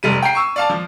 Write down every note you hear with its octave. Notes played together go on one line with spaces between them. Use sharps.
F1 G3 D#7
G5 A#5 C7
C#6 E6
D5 F5 A5
F3